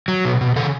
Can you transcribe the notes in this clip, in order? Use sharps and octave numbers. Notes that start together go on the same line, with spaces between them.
F#3
B2
B2
C#3 A4